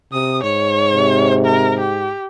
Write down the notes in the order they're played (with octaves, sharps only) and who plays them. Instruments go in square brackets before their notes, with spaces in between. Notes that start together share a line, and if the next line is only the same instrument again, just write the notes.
[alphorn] C3 [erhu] D#6
[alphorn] G#2 [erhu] C#5
[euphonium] C3
[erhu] A#4
G4